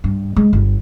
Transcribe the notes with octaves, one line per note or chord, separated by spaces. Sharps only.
G2
G#3
G1